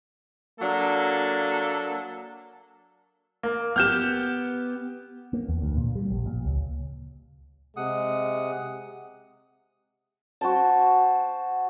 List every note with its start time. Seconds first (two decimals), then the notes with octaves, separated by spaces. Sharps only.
0.61 F#3 A#3 D4 A4
3.43 A#3
3.76 B3 G4 F6 G6 E7
5.33 A#3
5.48 E2
5.62 D2
5.77 A#2
5.96 G3
6.10 A#1
6.26 A#2
6.45 C#2
7.77 C3 G#3 F#5 D#6
10.41 F#4 C5 G5 A5